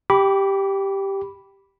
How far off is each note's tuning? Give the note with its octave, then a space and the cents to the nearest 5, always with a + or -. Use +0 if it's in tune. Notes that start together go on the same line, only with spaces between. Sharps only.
G4 +0 B5 -5 D6 -25